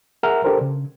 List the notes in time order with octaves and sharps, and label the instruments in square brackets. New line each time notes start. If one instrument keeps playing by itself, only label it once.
[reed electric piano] G#4 A#4 E5 F#5 A#5 F6
D4 G4 A4 A#4 C5
C#3